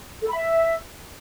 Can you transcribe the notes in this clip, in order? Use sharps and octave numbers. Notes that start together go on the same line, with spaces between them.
A4
B5
E5